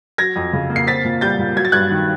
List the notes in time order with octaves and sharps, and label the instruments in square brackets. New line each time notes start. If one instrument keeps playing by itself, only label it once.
[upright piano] F#3 G#6 A#6
F2
C#3
A#3
C7
C4 A6 B6
A#2
G3 G6 A6
A#2
F#3 G#6
A6
G2 F#6 G#6
D#3